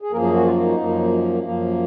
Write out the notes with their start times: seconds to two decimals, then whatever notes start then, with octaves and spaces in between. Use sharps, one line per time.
0.02 G#4
0.11 F#2 F3 A#3 A#4
0.22 G#4
0.33 F#4
0.45 F4
0.60 D#4
0.77 F#2 F3 A#3
1.41 F#2 F3 A#3